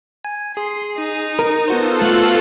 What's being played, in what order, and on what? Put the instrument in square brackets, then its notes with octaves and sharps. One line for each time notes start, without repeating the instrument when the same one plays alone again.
[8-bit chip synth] G#5
[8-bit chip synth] G#4 [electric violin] C6
[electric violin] D#4
[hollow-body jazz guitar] A#4
[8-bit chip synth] B3 F#4 C5 [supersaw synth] F4 A4
[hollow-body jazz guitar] A3 [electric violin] F#6